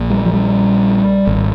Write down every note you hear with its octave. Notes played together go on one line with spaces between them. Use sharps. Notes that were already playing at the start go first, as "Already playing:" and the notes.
Already playing: A#1 A#2
G3
F3
G3
G#1